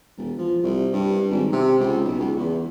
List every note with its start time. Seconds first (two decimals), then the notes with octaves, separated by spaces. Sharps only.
0.17 E1
0.38 F3
0.63 C2
0.93 G2
1.30 G#1
1.52 C3
1.80 C#2
2.04 B1
2.19 C#2
2.37 E2